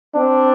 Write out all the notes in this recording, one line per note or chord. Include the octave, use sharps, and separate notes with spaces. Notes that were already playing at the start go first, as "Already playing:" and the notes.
C4 D4